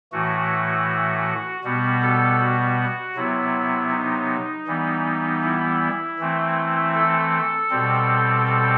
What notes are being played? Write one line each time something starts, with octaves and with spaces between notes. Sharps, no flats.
A2 E3 A3 F#4
B2 G3 B3 F#4
A4
F#4
C3 F#3 B3 E4
D#4
E3 G3 B3
E4
E3 A3 C4
A4
B2 G3 C4
A4